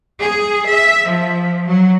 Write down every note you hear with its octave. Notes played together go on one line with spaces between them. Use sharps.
G#4
E5
F3
F#3